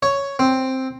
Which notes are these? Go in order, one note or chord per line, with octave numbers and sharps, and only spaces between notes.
C#5
C4